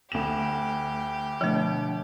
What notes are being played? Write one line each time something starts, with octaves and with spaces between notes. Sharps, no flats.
D2 G4 E7
B2 D3 F3 A3 C#5